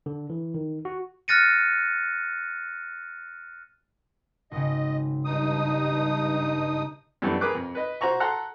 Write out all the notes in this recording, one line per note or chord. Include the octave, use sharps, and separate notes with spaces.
D3
E3
D#3
F#4
F6 F#6 A6 A#6 C#7 D#7
G#1 C#3 D#5
G2 D#4 D#6
F#2 E3 G3 A3 B3 D4
G#4 A#4 B4 D6 F#6
F2
B4 D#5
F#4 C5 A#5 C#6
A4 F#5 A#5 C6